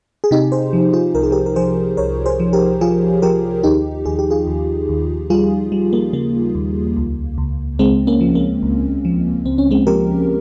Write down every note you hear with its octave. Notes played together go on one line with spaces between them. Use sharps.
G#4
C3 D#4 G4
G#4 C5
F3
F4 G#4
C2 A#4
G#4
G4 A#4
A#4
F3 G#4 C5
C2 A#4 C#5
G#4 C5
F3
G4 A#4
F3 F4 G#4
F3 G4 A#4
D#2 D#4 G4
D#2 G#4
G4
F4 G#4
D#2
D#2
G3 F4 G#4
G3
A#3
C#3 A#3
D#2
C#2
C#2
C#2 G#3 C4
A#3 C#4
F3
A#3
C#2
F3
C#2 C4
C#4
G#3 C4
F3 G4 A#4